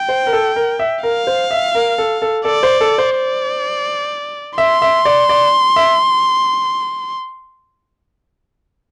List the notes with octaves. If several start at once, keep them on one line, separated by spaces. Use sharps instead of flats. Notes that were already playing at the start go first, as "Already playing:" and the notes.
Already playing: G5
C5
A#4
A4
A#4
E5
A#4 F5
C5
E5
A#4
A4
A4
A4 D5
C5
A4
C5
D5
E5 C6
E5
D5
D5
E5